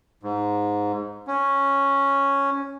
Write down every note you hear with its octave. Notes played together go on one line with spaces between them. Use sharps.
G#2
C#4